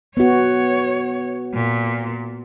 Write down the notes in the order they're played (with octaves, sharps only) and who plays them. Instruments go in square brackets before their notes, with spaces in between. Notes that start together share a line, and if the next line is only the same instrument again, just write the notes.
[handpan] B3 F#4 [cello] C#5
[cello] A#2